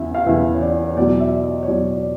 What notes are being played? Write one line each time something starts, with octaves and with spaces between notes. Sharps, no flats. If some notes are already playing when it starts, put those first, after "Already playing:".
Already playing: E2 C#3 E3 E5
F5
E2 C#3 E3 E5
C#5
D5
C#5
E2 B2 F#3 D5
E5
D#5
C#5
E2 B2 F#3 D5
D5